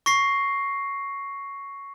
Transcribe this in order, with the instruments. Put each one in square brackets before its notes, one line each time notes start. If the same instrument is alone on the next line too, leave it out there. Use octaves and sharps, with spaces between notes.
[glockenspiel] C#6 A#6 C7